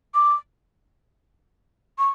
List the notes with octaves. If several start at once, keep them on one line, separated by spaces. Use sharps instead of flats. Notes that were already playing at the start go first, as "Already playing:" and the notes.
D6
C#6